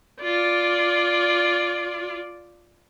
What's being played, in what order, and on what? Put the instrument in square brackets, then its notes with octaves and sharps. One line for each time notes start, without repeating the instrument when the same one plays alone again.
[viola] F4 D5